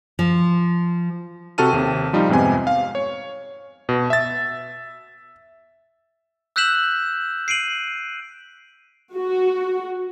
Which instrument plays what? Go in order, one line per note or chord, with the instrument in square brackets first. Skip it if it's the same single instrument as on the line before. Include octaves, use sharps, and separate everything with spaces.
[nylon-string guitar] F3
[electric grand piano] C3 F#4 A4 A5 F6 D#7
D#2 C3
F3 G3 D#4 F4
F2 G#2 C3 B3 G#5
F5
C#5
B2
E5 A6
[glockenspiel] E6 F#6 G6 B6 E7 F#7
C7 D7 D#7 F#7
[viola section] F#4